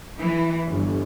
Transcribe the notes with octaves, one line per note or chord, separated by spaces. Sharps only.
E3
G1